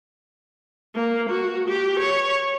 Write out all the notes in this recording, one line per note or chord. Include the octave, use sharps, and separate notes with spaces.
A#3
F#4
G4
C#5